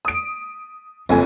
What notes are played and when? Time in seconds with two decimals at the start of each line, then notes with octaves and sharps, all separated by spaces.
0.05 D#6 D7
1.09 F#1 F2 A4 G#5